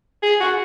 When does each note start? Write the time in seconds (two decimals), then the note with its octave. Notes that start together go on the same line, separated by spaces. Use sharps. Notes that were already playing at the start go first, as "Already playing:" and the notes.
0.23 G#4
0.40 F#4